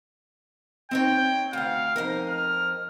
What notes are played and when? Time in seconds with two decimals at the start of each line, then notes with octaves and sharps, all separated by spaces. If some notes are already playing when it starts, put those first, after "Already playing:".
0.91 C4 D#4 C#5 G5
1.53 D2 F5 F#5
1.96 F2 D#4 A#4
2.29 F6